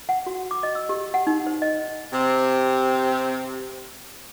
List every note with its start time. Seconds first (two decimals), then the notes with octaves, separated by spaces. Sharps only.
0.09 F#5
0.26 F#4
0.51 D6
0.63 D#5
0.75 E6
0.89 G4
1.14 F#5
1.27 D#4
1.46 C5
1.62 D#5
2.13 C3 C4